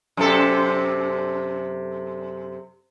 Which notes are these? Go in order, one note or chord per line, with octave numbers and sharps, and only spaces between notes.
F#2 C3 A4